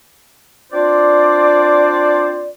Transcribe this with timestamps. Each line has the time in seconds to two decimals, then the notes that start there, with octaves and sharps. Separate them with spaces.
0.72 C4 D4 F4 C5 D5